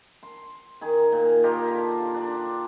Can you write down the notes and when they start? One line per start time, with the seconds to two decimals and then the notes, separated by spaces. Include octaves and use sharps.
0.23 C6
0.81 D#3 G#4
1.12 A#2
1.44 F4 G4 A#4 D#5
1.68 D3
2.14 D4